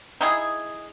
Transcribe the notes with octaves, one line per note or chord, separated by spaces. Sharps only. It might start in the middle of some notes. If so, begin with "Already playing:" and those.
D#4 E4 G#4